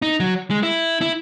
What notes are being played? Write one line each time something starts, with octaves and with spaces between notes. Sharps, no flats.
D#4
F#3
G#3
E4
E4